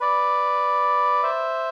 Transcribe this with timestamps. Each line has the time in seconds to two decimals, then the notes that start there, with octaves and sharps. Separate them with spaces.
0.01 B4 D5
1.23 C5 E5